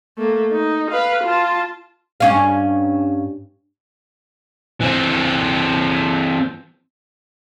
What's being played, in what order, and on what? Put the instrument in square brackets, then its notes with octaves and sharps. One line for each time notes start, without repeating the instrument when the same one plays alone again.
[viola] A3 A#3
D#4
B4 F5
F4 A5
[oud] G2 C#4 F5
[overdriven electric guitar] E3 C4